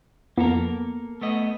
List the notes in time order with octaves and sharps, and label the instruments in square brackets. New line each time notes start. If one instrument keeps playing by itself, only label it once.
[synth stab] F2 B3 [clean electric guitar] A#3 A4 A#4
[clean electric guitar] A3 B3 D#5